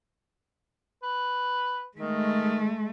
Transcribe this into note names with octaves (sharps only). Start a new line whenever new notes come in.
B4
D#3 G#3 A3